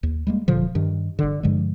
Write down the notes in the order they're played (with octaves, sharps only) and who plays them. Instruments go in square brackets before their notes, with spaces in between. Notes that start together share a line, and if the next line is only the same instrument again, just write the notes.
[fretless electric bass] D#2
G3 G#3 A#3
D1 A#2 D3 F3
G2 D#3
G1 D3
G2 D3 F3 G#3